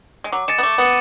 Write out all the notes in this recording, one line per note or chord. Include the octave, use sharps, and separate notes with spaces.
G#3
F#3 D6
G#3 A6 C#7 E7
B3
A3 D6
B3 A6 C#7 E7